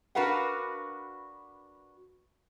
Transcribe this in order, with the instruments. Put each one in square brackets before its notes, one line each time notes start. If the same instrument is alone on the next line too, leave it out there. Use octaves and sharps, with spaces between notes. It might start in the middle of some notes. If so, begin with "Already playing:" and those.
[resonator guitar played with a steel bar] D4 F#4 A#4 B4 F5 F#5